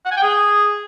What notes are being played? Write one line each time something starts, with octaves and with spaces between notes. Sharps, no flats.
F#5
G#5
G5
G#4